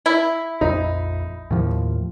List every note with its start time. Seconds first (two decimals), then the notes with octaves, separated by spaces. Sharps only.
0.06 E4
0.61 A#1 F2 D#4
1.51 D#2 A2 F3